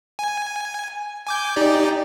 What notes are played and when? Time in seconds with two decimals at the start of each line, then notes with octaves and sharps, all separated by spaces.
0.19 G#5
1.27 G#5 D6 G6
1.56 D#4 G4 D5